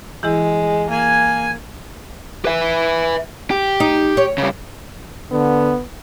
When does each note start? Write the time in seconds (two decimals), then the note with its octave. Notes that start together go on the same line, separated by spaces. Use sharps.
0.23 E3 G#3 E4 G#4
0.91 A#3 G#5
2.45 B4 E5
3.50 G4
3.80 D#4
4.17 C#5
4.38 C#3 G3
5.31 D3 B3